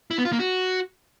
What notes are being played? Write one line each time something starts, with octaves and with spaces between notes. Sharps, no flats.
E4
B3
F4
A#3
F#4